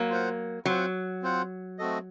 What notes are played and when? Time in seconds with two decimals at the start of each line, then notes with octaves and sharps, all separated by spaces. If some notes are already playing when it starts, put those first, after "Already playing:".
Already playing: F#3 A#3
0.09 F4 C5 F#5
0.65 F#3 C4 F4 C5 F#5
1.22 C4 F4 C5 F#5
1.79 A3 C4 F#4 A4 D#5